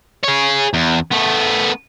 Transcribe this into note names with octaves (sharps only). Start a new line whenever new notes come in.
G#4 C#5
E2
A3 B3